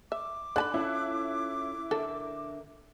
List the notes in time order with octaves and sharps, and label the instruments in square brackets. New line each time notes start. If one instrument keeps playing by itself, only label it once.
[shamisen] E5 [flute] D6
[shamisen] D3 A5 B5 [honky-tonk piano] F#6
[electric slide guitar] C#4 F4 A4 [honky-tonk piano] E4
[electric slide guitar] D3 A#4 E5 [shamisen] A4